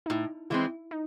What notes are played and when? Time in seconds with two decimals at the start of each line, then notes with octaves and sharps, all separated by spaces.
0.06 D#4
0.10 A2 E4
0.50 E3 G#3 C4 E4
0.91 D#4